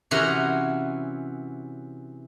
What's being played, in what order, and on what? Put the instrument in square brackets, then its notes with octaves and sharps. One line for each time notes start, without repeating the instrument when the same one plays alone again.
[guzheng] C3 E3 C#4 F#4 A#5